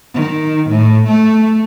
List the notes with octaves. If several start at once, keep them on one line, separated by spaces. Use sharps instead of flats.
D#3
A2
A3